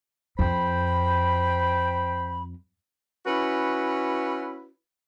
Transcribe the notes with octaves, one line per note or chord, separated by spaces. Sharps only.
F2 C5 G5 B5
C#4 E4 F#4 B4